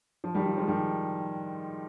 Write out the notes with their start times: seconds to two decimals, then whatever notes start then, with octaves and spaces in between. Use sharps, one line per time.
0.24 F3
0.35 D#3 G3
0.46 F3
0.57 F3 G#3
0.68 D#3 G3